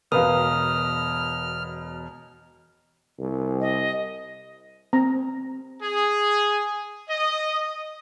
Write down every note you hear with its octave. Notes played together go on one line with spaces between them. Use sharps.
E1 B2 A#4 B4 F5 D#6 F6
C2
D#5
C4 A#5
G#4
D#5